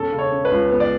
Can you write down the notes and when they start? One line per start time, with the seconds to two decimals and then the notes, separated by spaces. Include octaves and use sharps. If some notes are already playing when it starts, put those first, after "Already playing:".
Already playing: E1 C#4 A4
0.12 C#3
0.19 C#5
0.32 C#4
0.45 B4
0.52 C#2
0.72 B3
0.80 D5